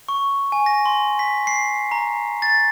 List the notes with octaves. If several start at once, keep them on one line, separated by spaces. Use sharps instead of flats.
C#6
G#5
A#6
C6
B6
C7
A#5
A6